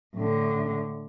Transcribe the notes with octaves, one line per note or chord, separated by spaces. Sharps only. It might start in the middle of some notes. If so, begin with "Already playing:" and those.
A2 D3